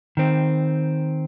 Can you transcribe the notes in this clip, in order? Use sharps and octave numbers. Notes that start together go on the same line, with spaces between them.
D#3 C4